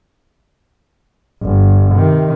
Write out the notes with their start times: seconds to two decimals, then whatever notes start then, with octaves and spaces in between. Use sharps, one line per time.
1.42 G1
1.95 C3 D#3